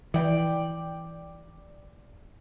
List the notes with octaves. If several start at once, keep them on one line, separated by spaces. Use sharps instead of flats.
E3 D5 G5